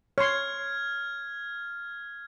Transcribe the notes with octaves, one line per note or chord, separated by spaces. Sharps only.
C#5 C6 F6 G#6